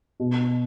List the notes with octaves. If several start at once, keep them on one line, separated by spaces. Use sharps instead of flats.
B2